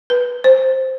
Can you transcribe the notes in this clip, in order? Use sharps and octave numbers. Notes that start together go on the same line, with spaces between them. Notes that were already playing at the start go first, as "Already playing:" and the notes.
B4
C5